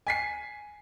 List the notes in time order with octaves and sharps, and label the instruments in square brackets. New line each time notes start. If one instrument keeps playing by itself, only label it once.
[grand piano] G#5 B6 C7